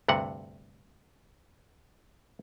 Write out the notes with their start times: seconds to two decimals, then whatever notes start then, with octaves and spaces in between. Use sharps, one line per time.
0.08 D2 G2 C3 F#5